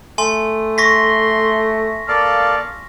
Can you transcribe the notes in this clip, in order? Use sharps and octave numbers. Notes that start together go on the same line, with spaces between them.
A3 G#5 C6
C6 C#6 A#6 B6
A#3 A4 D5 F5